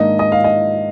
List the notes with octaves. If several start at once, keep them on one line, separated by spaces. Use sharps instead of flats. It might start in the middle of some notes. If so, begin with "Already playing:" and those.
Already playing: G#2 D#3 A#3 D4 D#5
D#5
F5
D#5